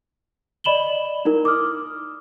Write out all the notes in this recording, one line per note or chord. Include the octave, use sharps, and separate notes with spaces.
D5 D#5 B5 E7 F#7 G7
D#4 E4 A#4
D6 D#6 F6